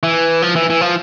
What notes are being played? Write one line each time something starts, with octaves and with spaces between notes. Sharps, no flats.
E3
F3
E3
E3
F3